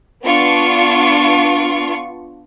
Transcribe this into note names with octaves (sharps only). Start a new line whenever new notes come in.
B3 D4 F4 C#6 D7